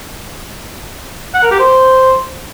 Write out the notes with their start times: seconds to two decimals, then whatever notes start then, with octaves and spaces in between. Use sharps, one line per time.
1.34 F#5
1.43 A#4
1.51 G4
1.60 C5